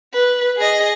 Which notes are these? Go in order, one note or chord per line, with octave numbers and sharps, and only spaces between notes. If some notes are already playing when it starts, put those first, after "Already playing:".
B4
G#4 D#5